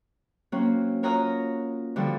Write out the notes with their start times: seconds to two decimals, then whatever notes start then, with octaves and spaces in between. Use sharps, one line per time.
0.52 F#3 A#3 C4 C#4 F#4
1.03 F4 A#4 C#5 F#5 A#5 D#6
1.96 D3 E3 F3 G3 F#4